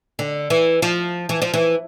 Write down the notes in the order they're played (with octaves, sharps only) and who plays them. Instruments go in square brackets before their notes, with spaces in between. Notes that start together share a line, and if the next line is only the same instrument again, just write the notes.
[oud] D3
E3
F3
E3
F3
E3